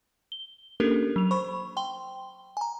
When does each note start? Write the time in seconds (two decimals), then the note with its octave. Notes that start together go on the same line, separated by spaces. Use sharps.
0.32 G7
0.80 A#3 C#4 D4 G4 A4 A#4
1.16 F#3 F7
1.31 C5 B5 C#6
1.77 G5 C6 G7
2.57 G#5 A#5